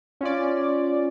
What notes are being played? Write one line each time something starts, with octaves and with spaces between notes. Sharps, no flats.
C#4 F4 D5